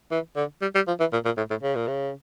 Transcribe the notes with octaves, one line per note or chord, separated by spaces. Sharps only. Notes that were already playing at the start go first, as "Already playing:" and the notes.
E3
D3
G3
G3
F3
E3
A#2
A#2
A2
A2
C#3
A#2
C#3